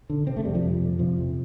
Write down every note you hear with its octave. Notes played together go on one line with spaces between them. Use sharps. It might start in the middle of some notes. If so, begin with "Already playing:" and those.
D3
C3 C4
A3
F2 G3
F3
F2
C3
C3 F3
F2